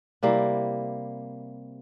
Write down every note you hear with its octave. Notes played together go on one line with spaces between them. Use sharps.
C3 G3 A#3 E4